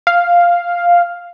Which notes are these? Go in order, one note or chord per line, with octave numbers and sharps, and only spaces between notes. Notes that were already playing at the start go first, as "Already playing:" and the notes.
F5